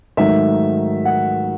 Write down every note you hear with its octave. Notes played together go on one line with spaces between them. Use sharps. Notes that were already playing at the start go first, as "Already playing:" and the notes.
G#2 D#3 F#3 A3 E5
F#5